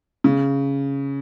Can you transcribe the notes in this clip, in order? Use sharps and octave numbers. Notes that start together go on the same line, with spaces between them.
C#3